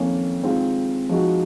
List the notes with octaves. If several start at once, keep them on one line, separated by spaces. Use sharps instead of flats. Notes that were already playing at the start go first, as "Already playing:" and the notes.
Already playing: F2 D#3 A#3 C#4
D#3 G#3 C4 F4
F3 G#3 D#4 F#4